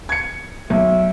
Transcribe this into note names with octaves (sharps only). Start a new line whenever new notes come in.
G#6 C#7
B1 E5